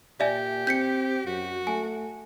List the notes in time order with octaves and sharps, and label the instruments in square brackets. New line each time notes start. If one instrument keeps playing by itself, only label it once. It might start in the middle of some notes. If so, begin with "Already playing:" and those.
[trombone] A#2 [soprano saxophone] G4 [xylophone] D5 E5 G#5
[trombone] C4 [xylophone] G6 B6 C#7
[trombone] F#2 [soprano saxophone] F#4
[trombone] A3 [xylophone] G#5